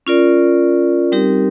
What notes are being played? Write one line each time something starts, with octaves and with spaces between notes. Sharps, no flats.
C#4 F4 A#4 D5
G3 C4 D#4 G4 A#4